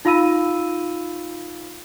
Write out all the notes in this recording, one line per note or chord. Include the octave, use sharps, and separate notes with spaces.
D#4 F4 F5 B5 E6 D#7